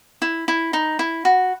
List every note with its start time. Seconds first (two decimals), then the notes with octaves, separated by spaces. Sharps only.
0.22 E4
0.48 E4
0.73 D#4
0.99 E4
1.25 F#4